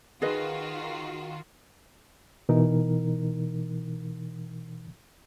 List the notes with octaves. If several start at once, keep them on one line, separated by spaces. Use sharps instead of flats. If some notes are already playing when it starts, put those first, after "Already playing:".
D#3 F4 F#4 G#4 B4 D#5
B2 E3 D#4 A#4